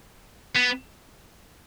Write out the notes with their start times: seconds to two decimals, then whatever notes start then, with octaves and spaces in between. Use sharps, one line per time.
0.56 B3